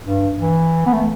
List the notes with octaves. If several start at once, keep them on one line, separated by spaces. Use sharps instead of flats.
G2
E3
B3
A3